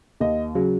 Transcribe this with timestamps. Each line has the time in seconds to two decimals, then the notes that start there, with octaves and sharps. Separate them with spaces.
0.20 D#2 D#5
0.55 C#3 F#3